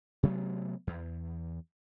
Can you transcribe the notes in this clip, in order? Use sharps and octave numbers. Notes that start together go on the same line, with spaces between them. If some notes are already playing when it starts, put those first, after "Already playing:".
C3 F#3 A3 B3
E2